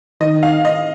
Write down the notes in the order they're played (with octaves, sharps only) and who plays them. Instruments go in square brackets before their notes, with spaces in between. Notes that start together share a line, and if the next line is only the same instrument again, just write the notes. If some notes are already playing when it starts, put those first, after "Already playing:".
[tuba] D#3 [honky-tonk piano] D#5
[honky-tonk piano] F5
D#5